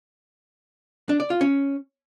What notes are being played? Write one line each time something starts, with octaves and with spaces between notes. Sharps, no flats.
D4
D5
F4
C#4